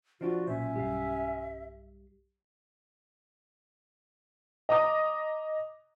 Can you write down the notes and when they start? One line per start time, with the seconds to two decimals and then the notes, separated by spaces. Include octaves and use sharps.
0.21 F3 D4 F4 F#4
0.47 B1 A#2 C#4 C5 E5
0.76 B1 G2 G4 F5
4.69 D#5 A#5 D6 D#6